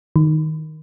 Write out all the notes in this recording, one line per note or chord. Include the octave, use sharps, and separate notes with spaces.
D#3